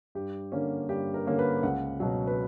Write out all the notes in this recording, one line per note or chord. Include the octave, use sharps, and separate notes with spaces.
G2 G4
D3 A#3 C#4
G2 G4
A#4
D3 A#3 C#4
B4
C#2 F#5
B2 F#3
B4